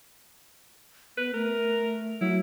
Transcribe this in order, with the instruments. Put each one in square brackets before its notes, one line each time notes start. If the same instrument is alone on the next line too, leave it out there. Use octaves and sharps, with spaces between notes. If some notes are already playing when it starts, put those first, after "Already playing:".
[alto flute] B3 [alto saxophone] B4
[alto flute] A3 [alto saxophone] A#4
[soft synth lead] F#3 [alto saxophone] E4